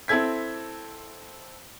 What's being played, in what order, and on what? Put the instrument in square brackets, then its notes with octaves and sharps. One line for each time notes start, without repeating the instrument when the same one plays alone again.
[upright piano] C4 E4 A4 G#6 B6